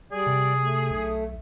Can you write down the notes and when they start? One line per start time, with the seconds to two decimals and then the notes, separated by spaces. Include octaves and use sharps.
0.12 G3 G#4 D5
0.27 C3
0.63 A3
0.91 B1